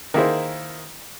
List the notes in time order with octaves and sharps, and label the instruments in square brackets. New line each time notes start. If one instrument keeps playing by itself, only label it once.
[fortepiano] D#3 A#3 E4 G#4 C5